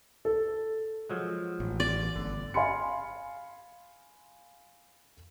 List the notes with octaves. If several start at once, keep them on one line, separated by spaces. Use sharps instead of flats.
A4
F3 F#3 G#3
A1
D5
G1 D3
F5 G#5 B5 C6 C#7